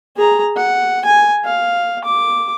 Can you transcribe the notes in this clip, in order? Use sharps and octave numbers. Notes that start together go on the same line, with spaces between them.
G#4 A#5
F#5
G#5
F5
D6